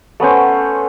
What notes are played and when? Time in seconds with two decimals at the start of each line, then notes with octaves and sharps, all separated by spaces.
0.20 A3 B3 C#4 C5